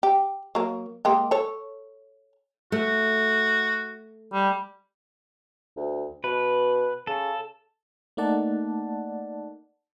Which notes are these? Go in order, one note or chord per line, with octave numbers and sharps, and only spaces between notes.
G4
F#3 A#3
G#3 A#3 G4
A4 C#5
A3 F#4
G3
D2
B2 B4
C#3 A4
A3 A#3 D#4 D5 F#5 A5